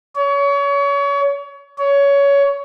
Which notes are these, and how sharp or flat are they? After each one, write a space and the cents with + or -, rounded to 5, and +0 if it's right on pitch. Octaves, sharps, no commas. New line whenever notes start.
C#5 +30
C#5 +20